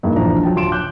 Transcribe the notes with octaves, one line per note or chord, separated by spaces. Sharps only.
G2 A#2 G#3 A#3 D#4 E4
E1 A#1 E3 F3 D4 A#5
F#3 F4 G5 A5
D1 C6 D7 E7
D6 F#6 G6